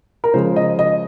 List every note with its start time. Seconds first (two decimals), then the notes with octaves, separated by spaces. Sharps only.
0.24 A#4
0.34 C#3 F3 G#3 C5
0.56 D#5
0.79 D#5